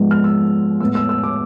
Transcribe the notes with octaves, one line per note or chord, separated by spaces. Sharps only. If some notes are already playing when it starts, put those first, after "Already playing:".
Already playing: G#2 F3 G#3 B3
F6
E6
A2 G#3 B3 E6
E6
E6
D6